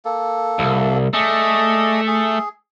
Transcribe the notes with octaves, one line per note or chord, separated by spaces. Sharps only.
A#3 A4
C2
A3 G#4 D5 D#5
G#4